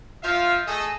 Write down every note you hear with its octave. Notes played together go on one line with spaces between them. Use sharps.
F3 F4 E5 F5
A3 G#4 A4 D#5